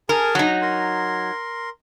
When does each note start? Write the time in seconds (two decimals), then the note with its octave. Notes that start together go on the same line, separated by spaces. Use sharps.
0.09 G#4 A#4 G#5 A5
0.35 F#3 D#4
0.62 A#4 C6